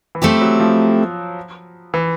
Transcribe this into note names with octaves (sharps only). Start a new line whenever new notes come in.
E3
F3 A3 C4 E4 G4
F#3
F3
E3